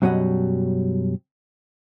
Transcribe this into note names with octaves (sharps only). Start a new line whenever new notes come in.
F#2 B2 F#3 G3 D#5 F#5